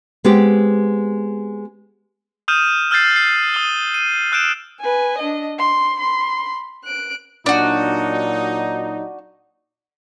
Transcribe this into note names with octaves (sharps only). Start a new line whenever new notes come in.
G#3 B3 C4 G4
D#6 F6 G6 D#7 E7
E6 F6 G6 A6 C7
C7
D#6 D#7 G7
D#7
E6 F#6 G6 D7 E7
B4 G#5
D4 D#5
C6
B5 C6
F#6 D7
A#2 F#3 D4 D#4 F#4